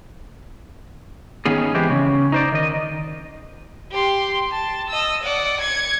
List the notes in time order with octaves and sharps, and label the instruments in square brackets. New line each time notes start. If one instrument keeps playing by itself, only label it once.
[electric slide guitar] D#3 B3 C#4 G#4
E3 G#3 C4 E4 G4
C#3 C#4
D#4 C5 D5
D#3 D#5
[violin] G4 C6
A5
D#5 E6
D5 F#5
G#6 C#7